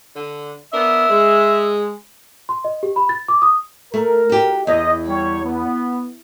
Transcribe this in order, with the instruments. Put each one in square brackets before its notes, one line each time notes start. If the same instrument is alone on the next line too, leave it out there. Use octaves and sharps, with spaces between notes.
[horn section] D3
[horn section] B3 D4 A#4 [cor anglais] E5
[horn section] G#3
[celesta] C6
D#5
G4
B5
A6
D6
D#6
[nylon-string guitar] A3 [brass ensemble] A#4
[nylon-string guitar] F#4 G4
[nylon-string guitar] E2 [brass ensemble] D#5
[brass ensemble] G3 C#5
B3